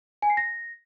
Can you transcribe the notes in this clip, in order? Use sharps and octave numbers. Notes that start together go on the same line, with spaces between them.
G#5
C7
A#6